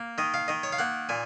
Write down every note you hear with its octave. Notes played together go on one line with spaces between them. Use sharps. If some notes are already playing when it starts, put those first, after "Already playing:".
Already playing: A#3
D#3 D#5
F5
D#3 D#5
C#5
F5
A#3 F#5
A#2 G#5